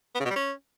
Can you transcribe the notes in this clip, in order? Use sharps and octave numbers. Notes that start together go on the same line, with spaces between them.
B3
C#3
B2
G3
C#4